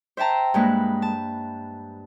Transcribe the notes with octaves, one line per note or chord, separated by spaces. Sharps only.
C5 E5 G5 A5 A#5
G2 G#3 A#3 B4
A5